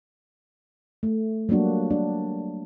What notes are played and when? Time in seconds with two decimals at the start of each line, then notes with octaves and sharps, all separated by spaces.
1.03 A3
1.49 F#3 G3 A#3 D4 F#4
1.91 D4